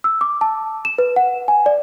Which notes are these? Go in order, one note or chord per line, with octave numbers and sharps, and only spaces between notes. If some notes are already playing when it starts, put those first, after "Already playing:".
E6
D6
A5
E7
B4
F#5
G#5
D5